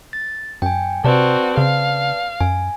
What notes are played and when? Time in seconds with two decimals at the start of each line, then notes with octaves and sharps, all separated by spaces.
0.13 A6
0.62 F#2 G5 G#5
1.04 C3 C4 F#4 B4 D5 A5
1.57 C#3 F5
2.41 F#2 G#5